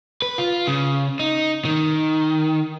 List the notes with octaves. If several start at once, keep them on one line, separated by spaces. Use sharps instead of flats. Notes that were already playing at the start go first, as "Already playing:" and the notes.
B4
F4
C#3
D#4
D#3